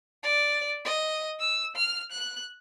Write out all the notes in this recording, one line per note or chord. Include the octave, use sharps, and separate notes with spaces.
D5
D#5
E6
F6
F#6